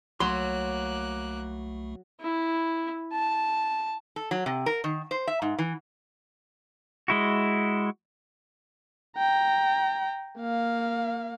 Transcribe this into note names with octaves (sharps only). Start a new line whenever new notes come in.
C2 F#3 A3 A#3 C6 F#6
E4
A5
A4
F#3
C3
A#4
D#3
C5
E5
G#2
E3
G#3 E4 F#4
G5 A#5
A#3 F5